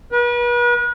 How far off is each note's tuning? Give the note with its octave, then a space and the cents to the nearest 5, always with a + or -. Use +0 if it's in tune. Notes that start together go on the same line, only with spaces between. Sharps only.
B4 -40